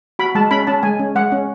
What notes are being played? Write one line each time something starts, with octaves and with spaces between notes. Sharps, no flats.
F#4 B5
G#3 A5
C#4 B5
C#4 A5
G#3 G#5
C#4
G#3 F#5
C#4